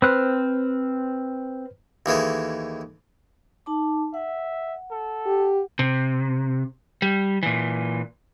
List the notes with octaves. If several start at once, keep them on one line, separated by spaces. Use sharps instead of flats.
C4 B4 C5 F6 F#6
D#2 E3 G#3 A3
D#4 A5 D6
E5 F#5
A4
G4
C3
G3
A#2 E3